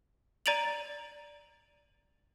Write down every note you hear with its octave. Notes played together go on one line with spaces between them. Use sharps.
D5 A#5 A6 D7 F7 F#7